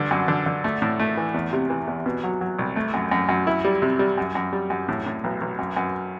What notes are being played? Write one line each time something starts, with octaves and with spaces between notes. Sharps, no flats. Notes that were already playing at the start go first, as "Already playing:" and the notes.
Already playing: G2 D3
F#2
D3
D3
A3
A2
A3
E3
E2
C3
E3
E2
B2
F#3
F#3
C2
A3
F#2
F#2
F#2
E4
G3
C3
G3
F#2
F#2
G3
F#2
A2
A2
B1
B1
F#2
F#2